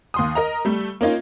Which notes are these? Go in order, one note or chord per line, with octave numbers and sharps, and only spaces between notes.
D#2 C6 D#6
A#4 D#5 A#5
G3 A3
A#3 C#4 D#4 F4